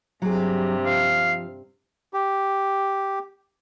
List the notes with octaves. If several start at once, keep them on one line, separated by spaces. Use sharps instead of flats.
G2 C3 F#3 G#4
F3 F5
G4